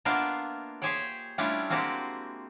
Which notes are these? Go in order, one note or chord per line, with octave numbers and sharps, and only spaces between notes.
A#3 B3 D4 F4 E5 F5
G4 G#4 C5 C#5 G5
G3 A3 C#4 D4 E4 F4
G#3 A#3 C4 F#4 G4